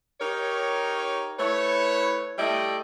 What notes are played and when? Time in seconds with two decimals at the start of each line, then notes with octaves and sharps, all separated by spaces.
0.20 D#4 G4 A#4 C#5
1.39 A3 E4 B4 C#5
2.38 G3 A3 E4 D5 D#5 G5